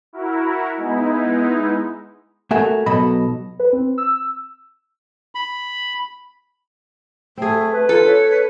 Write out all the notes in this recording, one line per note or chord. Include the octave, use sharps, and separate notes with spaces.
E4 F#4 A#4
G#3 B3 D#4 E4
A3 F#4 A4 A#4 E5 G#5
B1 B2 F#3 A4 D#5 B5
B4
C4
E6
B5
A3 C4 G#4
B4
F4 A4
C#5
B4